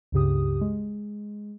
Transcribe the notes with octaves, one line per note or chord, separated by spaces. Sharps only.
C#2 G2 C#3 G4 D#6
G#3